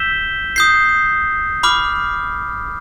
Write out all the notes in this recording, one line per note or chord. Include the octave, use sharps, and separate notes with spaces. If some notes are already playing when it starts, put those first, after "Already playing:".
Already playing: E6 G6 B6 E7 G7
D#6 G6 C7
B5 D6 F6